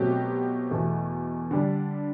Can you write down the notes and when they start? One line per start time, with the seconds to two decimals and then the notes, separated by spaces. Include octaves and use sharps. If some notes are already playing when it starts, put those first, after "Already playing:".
Already playing: B2 F#3 A3 C4 G4
0.71 E2 B2 A3
1.51 D3 G3 D4